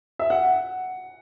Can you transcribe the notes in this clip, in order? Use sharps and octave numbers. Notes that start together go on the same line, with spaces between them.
E5
F#5